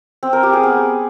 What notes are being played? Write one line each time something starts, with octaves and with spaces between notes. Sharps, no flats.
C4
A#4
G4
G#4
B3